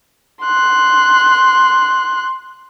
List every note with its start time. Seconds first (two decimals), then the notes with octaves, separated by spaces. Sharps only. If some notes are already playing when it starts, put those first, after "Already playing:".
0.42 C6 F#6